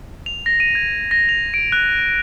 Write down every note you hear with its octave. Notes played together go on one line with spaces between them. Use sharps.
F7
A#6
D#7
G#6
A#6
F7
D7
F#6